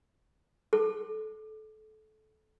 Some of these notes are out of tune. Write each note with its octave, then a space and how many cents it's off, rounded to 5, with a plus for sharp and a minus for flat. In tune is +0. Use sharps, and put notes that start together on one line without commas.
A4 -25